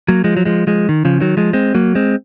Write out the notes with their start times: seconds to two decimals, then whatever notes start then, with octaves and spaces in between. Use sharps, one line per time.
0.08 F#3 A#3
0.24 F3 G#3
0.37 F#3
0.45 F3 G#3
0.67 F3 G#3
0.89 D#3
1.05 C#3 F3
1.20 D#3 F#3
1.37 F3 G#3
1.53 G#3 C4
1.75 F#3 A#3
1.95 G#3 C4